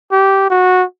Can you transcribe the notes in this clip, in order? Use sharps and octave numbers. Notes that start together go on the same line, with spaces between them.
G4
F#4